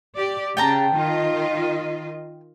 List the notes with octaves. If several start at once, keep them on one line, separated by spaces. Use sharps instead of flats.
G4 D5
C#3 G5 A5 A#5
D#3 F4 D#5